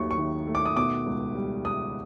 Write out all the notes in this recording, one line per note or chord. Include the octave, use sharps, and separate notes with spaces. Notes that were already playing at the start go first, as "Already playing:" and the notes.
Already playing: D#2 D#3 F#3 A3 C#6
C#6
D#3
A3
D6
D#6
B2 D6
C#2
G3
C#2 D#6